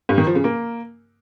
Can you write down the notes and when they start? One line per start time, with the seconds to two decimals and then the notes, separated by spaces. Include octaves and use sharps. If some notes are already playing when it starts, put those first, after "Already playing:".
0.09 G2
0.18 D#3
0.27 F3
0.35 C#3
0.44 A#3